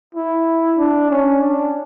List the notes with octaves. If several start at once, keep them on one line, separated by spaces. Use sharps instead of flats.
E4
D4
C#4
D4